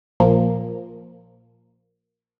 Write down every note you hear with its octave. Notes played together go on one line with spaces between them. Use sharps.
A#1 A#2 F3 A#3